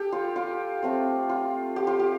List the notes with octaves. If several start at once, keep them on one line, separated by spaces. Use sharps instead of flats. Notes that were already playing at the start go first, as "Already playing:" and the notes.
Already playing: G4 A4
F4
F4
A3 C4 F4
F4
G4
F4
G4